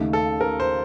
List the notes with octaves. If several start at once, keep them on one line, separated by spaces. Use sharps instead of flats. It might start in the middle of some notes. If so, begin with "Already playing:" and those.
Already playing: D#2 C#3 A3 D#4
A4
A#4
C5